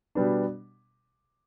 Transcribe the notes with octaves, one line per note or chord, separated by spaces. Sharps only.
B2 G3 B3 D4